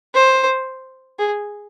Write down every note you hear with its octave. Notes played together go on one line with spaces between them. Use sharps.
C5
G#4